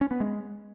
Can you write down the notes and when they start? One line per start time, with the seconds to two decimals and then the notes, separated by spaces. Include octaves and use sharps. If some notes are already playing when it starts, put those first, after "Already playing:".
0.01 C#4
0.11 B3
0.20 G#3